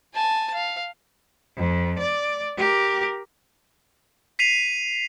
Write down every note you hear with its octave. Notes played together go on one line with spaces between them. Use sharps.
G#5 A5
F5
F2
D5
G4 A#4
B6 C7 D#7 F7